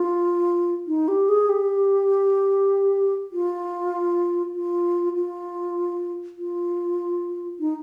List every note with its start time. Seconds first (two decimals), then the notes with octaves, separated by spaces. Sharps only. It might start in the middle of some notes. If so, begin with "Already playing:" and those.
Already playing: F4
0.88 D#4
1.08 G4
1.29 G#4
1.49 G4
3.32 F4
4.54 F4
5.16 F4
6.38 F4
7.60 D#4